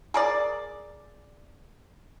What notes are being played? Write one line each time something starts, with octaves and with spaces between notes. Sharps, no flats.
G#4 A#4 D5